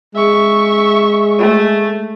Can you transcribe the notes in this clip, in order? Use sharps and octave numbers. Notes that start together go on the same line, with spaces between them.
G#3 E5 C#6
A3